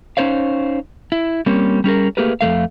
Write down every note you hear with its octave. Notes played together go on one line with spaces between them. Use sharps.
C#4 D#4 C5 C#5 F5
E4
G3 A#3 C4 C#4
G3 C#4 G#4 A#4
A3 A#3 G4 G#4 A#4 B4
F2 F3 A3 F5